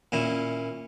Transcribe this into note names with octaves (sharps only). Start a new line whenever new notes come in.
A#2 C#4 E4